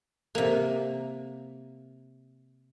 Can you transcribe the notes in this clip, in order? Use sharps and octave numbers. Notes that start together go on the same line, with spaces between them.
C3 A#3